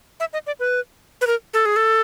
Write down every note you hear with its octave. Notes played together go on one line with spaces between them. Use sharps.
E5
D#5
D5
B4
B4
A#4
A4
G#4
A4